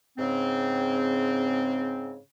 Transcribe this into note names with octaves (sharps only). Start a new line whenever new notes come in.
G#2 C#3 C4